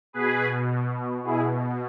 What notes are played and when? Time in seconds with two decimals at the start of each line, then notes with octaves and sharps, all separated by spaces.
0.13 B2 G#4 B4
1.24 B2 E4 G#4